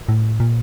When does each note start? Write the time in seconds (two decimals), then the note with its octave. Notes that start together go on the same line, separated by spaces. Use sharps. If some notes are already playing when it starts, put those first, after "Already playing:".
0.09 A2
0.40 A#2